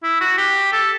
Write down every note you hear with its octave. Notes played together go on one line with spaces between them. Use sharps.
E4
F#4
G4
A4